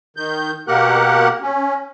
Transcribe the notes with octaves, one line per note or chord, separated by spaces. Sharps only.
D#3 G6
B2 A#3 G4 A#4 F#5 F#6
C#4